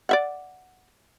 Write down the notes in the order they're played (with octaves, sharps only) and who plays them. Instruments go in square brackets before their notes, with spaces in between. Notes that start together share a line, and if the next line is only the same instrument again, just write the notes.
[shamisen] D5 E5 F#5